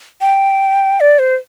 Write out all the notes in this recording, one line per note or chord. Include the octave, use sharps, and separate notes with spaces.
G5
D5
C5